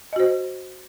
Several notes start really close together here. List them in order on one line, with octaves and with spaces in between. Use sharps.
D#5 F#4 C5